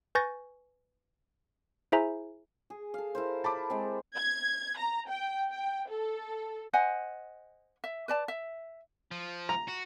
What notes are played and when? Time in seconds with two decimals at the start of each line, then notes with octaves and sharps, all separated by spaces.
0.15 B4 G#5 C#6 G6 A6 A#6
1.92 E4 G#4 C5 E5 G#5 A#5
2.70 G#4
2.94 A4 F5
3.15 E4 A#4 C5
3.44 A5 B5 D6
3.70 G#3 C4
4.16 G#6
4.78 A#5
5.08 G5
5.51 G5
5.89 A4
6.73 C5 D#5 F#5 G#5
7.84 E5
8.08 B4 D5 A5
8.28 E5
9.12 F3
9.49 A#5
9.68 F#4